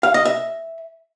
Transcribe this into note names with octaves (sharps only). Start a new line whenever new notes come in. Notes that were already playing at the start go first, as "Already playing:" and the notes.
F5
D#5
E5